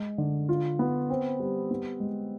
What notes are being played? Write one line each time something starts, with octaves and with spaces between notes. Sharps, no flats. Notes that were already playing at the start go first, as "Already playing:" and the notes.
Already playing: G#3
D3
F4
B3
C4
G3
B3
G#3